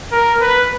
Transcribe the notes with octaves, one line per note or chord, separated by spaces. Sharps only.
A#4
B4